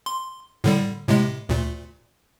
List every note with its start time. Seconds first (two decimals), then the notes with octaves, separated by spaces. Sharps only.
0.06 C6
0.64 A2 D3 G3
1.08 A2 C3 G#3
1.49 D2 A#2